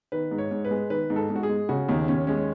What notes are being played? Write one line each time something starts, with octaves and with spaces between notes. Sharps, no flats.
D#3 B4
G#2
C#5
G#2
B4
G#3
D#3 B4
G#2
A4
G#2
F#4
G#4
G#3
C#3 F#4
D#2 D#4
D#2 C#4
G#3 C#4